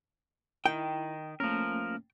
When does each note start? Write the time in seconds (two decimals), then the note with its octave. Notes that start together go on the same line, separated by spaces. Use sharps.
0.66 D#3 E4 G5
1.40 F3 A3 A#3 C#4 A#4